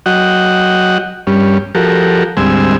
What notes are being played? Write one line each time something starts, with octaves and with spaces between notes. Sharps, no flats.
F#3 F#4 D#5 F#5 G5
G2 G3 C#4
F3 F#4 G4 A4 A#4
D2 G#2 G3 C4 G#5 E6